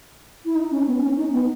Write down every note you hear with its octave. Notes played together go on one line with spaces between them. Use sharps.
E4
D#4
C#4
B3
C#4
D#4
B3